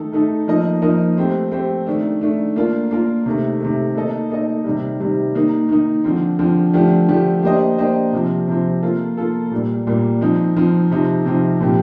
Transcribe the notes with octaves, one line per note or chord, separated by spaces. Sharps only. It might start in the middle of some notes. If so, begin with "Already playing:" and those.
Already playing: D#3 A3 D#4 A4
D#3 A3 D#4 A4
F3 A#3 D#4 A#4 D#5
F3 A#3 D#4 A#4 D#5
A3 C4 G4 C5
A3 C4 G4 C5
D#3 A3 D4
D#3 A3 D4
A#3 D4 F4 A#4
A#3 D4 F4 A#4
C3 D#3 A3
C3 D#3 A3
A#3 D#4 A4 D#5
A#3 D#4 A4 D#5
C3 D#3 G3
C3 D#3 G3
D#3 A#3 D#4
D#3 A#3 D#4
D3 F3 C4
D3 F3 C4
D3 F3 A3 D4 G4
D3 F3 A3 D4 G4
A#3 D4 G4 C5 D#5
A#3 D4 G4 C5 D#5
C3 F3 C4
C3 F3 C4
A#3 F4 A4
A#3 F4 A4
A#2 G3 A#3
A#2 G3 A#3
F3 C4 D#4
F3 C4 D#4
C3 F3 C4 D#4
C3 F3 C4 D#4
A#2 F3 C4 G4